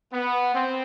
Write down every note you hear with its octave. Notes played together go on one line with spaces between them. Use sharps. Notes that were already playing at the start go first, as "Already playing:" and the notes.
B3
C4